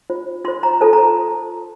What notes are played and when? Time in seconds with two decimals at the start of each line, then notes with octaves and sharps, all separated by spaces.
0.10 F4 C5
0.44 F4 C5 C6
0.63 A#5
0.81 F4 A4 C5 A5
0.93 A#5